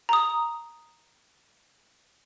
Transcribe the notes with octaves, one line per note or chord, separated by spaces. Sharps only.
A#5 D#6